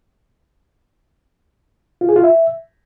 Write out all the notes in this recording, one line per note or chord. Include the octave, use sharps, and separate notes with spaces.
F4
G#4
F4
E5